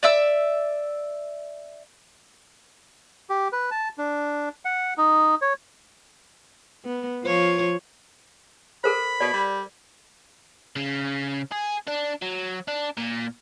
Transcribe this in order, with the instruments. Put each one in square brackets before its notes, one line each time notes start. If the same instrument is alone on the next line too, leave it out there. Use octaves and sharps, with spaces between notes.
[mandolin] D5 E5 E6
[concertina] G4
B4
A5
D4
F#5
D#4
C#5
[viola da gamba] B3
F3 F4 C#5
[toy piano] A4 A#4 C5 [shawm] B5
[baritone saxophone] B2 [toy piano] D5
[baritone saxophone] G3
[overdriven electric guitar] C#3
G#4
D4
F#3
D4
A#2